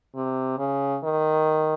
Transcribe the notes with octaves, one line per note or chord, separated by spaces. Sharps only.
C3
C#3
D#3